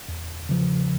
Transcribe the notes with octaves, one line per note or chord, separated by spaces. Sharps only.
E2
C#3 F3